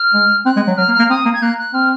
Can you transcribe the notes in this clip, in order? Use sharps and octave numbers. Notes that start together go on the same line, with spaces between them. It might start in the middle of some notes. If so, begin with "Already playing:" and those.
Already playing: F6
G#3
C4 F#6
G#3
F#3
F#3 F6
A#3
F6
A#3
C4 D#6
A#3
G#6
A#3 F#6
F#6
C4 F6